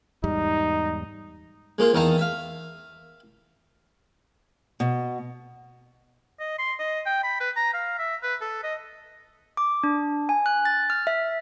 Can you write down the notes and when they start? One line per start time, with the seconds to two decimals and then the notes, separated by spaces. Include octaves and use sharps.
0.24 E2 G#2 G3 D#4
1.78 G#3 A#3 F4
1.93 E2 D#3 D#4 F5 A5 A#5
2.18 E5 F5
4.80 B2
6.40 D#5
6.59 C6
6.79 D#5
7.06 G5
7.24 B5
7.40 B4
7.56 A#5
7.73 F5
7.99 E5
8.23 B4
8.41 A4
8.64 D#5
9.57 D6
9.84 D4
10.29 G#5
10.46 F#6
10.65 A6
10.90 F6
11.07 E5